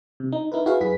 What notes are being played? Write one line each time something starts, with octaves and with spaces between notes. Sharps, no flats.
C3
D#4
D#4 E4 A#4 B4
E4 F#4 G#4 B4 F5
F#2 G#4 B4 B6